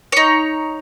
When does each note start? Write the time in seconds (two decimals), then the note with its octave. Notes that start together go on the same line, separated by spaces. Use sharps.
0.12 D#4 C#5